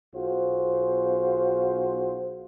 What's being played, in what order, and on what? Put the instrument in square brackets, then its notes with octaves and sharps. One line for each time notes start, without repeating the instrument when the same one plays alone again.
[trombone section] B1 F4 F#4 G#4 C5